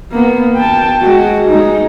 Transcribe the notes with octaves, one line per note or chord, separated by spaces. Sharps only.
A#3 B3
G5 A5
G#3 F#4
G#3 D#4